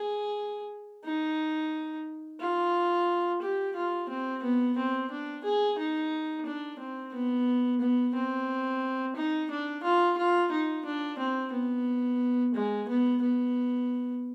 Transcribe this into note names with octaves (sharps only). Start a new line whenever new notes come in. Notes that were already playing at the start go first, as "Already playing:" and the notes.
Already playing: G#4
D#4
F4
G4
F4
C4
B3
C4
D4
G#4
D#4
D4
C4
B3
B3
C4
D#4
D4
F4
F4
D#4
D4
C4
B3
G#3
B3
B3